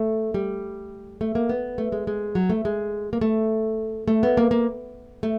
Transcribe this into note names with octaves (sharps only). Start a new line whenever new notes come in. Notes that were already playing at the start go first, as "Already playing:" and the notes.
Already playing: A3
G3
A3
A#3
B3
A3
G#3
G#3
F#3
A3
G#3
A#3
A3
A3
B3
A#3
A#3
A3